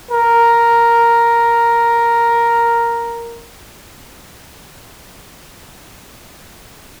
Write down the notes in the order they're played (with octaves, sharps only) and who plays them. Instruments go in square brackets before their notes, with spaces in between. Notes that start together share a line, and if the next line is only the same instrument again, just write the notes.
[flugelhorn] A#4